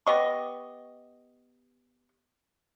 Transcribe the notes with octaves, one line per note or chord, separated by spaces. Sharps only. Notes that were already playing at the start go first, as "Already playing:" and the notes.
B3 G4 D#5 C#6